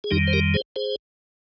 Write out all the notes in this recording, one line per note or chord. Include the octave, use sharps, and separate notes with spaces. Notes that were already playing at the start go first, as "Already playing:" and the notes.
G#4
F2 D#3 G3 D#4 G4
C5
G4 A#4
G#4 C5
G#4 C5